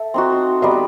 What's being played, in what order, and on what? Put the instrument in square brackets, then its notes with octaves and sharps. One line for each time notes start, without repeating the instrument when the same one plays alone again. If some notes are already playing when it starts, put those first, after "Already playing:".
Already playing: [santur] A4 [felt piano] E5
[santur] C4 D#4 F#4
[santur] G3 B3 D#4 [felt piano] D#5